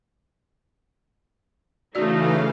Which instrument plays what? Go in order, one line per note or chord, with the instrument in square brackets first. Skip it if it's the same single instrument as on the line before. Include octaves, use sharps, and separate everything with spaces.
[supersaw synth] C#3 E3 F5 [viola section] A3 D#4 [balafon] F#4 D5